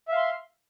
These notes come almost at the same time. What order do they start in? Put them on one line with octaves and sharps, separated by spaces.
E5 F5 C6